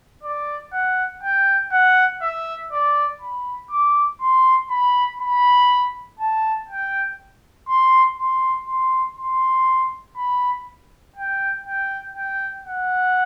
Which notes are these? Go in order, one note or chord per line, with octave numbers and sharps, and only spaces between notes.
D5
F#5
G5
F#5
E5
D5
B5
D6
C6
B5
B5
A5
G5
C6
C6
C6
C6
B5
G5
G5
G5
F#5